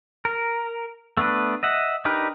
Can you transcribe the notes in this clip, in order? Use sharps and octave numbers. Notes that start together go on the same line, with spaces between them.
A#4
A3 B3 D4 B4
D#5 E5 F#5
D4 D#4 G4 A#4 B4